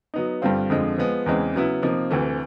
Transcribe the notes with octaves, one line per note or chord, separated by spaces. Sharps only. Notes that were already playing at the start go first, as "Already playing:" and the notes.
F#3 B3 D#4
G2 D3 G3 C4 F4
F2 D3 F3 G#3
F3 G#3 B3
E2 C#3 E3 G#3 C4
C#3 F#3 B3 E4
C3 F3 A#3 D#4
D2 C3 E3 A3